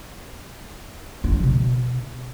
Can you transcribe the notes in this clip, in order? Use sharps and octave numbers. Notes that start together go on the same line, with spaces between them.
D4
F#3
B2